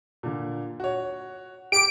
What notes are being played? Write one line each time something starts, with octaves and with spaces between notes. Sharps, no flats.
A#2 D3
F#4 C#5
G4 D6 D7